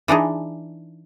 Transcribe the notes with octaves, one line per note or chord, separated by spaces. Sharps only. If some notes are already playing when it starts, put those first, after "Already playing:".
E3 D4 D#4 G#4